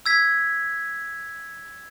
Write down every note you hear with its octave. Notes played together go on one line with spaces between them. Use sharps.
E6 G#6 B6